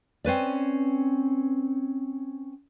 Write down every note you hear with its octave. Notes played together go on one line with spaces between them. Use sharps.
C4 C#4 B4 D5